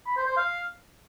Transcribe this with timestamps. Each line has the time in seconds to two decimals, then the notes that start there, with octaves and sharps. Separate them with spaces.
0.06 B5
0.17 C5
0.27 C5
0.37 F5